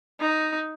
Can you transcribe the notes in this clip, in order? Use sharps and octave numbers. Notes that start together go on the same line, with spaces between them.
D#4